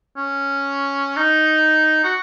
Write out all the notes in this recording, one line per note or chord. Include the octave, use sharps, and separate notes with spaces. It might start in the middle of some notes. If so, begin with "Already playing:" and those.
C#4
D#4
F#4